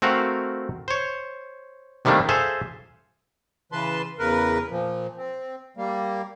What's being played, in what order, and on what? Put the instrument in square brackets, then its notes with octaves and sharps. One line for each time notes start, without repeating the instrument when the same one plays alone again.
[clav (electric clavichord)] A3 C4 F#4 A#4 F5
C5 C#5
C3 D#3 G3 A3 A#3 D4
G#4 A4 C5 E5 F5
[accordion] C#3 E3 B4 A5 C6
E2 C#3 A#4 B4
A#2 F3
C4
G3 A#3